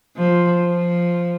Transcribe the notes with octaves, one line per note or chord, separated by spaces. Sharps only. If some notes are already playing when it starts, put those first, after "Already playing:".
F3
F3